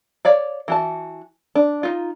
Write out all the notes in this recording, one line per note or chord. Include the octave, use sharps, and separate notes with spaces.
C#5 D5 F5
E3 F#4 A5
D4
D#4 F4